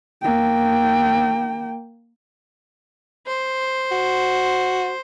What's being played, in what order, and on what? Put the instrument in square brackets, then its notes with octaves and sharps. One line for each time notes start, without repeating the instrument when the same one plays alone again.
[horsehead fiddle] A#3 G5
[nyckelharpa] C5
[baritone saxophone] F#4